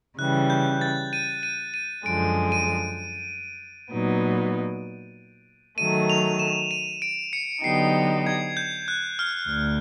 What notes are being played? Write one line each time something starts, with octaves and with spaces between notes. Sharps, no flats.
C#3 E3 G3 F#6
G6
A6
D#7
D#7
D#7
F#2 D3 F3 G#3 D7
D#7
A#2 F#3 B3 D#4
D#3 F#3 A3 D#7
F7
E7
D#7
D7
C#7
D3 F#3 B3 D#4 G4 C7
G#6
G6
F#6
F6
D2